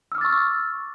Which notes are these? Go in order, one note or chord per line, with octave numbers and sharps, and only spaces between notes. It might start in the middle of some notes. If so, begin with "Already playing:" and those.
C#6 D6 E6 F6 A6